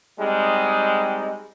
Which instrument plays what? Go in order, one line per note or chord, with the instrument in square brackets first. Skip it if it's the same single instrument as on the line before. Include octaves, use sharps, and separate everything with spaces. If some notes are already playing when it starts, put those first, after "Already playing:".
[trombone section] G3 G#3 C4 D#4